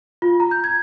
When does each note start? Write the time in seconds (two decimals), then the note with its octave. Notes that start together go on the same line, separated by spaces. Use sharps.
0.22 F4
0.40 A#5
0.51 G6
0.64 G#6